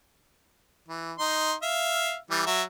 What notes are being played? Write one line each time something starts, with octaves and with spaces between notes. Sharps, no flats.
E3
D#4 C6
E5 F5
E3 G3
F#3 E5